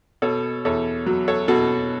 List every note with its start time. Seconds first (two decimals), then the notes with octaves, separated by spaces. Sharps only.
0.22 B2 A4 C#5
0.65 E2 A4 C#5
1.06 F#3
1.28 A4 C#5
1.48 B2 F#4 A4